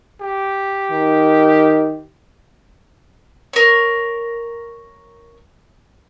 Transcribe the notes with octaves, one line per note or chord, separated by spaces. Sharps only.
G4
D#3
A#4 C#5